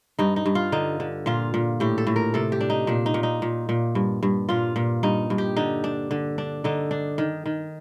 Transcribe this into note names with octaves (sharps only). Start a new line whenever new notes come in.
G2 D#4
D#4
G2
F4
D3 D#4
D3
A#2 F4
A#2
A2 G4
A4
A2
A#4
C3 A4
G4
D4
D#4
A#2 D4
D#4
A#2
D#4
A#2
A#2
G2
G2
A#2 F4
A#2
G2 D#4
G2
G4
D3 D#4
D4
D3
D4
D3 D#4
D4
D#3
D#3